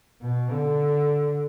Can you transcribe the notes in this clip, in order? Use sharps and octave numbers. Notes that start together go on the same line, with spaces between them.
B2
D3